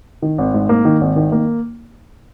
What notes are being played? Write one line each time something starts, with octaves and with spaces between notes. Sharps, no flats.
D#3
G#1
G#2
A#3
D#3
G#1
D#3
A#3